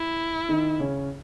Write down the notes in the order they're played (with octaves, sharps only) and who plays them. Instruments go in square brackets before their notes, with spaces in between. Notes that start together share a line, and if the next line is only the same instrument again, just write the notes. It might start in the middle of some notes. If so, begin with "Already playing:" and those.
Already playing: [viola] E4
[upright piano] D#3 D#4
C#3 C#4